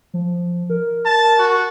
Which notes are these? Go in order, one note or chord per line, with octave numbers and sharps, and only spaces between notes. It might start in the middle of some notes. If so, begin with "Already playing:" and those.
F3
A#4
A5
F#4